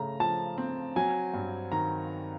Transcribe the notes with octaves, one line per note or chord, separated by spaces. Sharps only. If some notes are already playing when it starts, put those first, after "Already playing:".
Already playing: C#3 A3 A#5
F3 A5
C4
F#3 G#5
G2
D#3 A#5